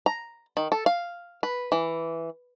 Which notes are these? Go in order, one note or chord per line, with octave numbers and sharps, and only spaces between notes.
A#5
D#3
A4
F5
B4
E3